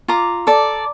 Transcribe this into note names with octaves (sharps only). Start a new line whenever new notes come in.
F4 A#5 D6
A4 D5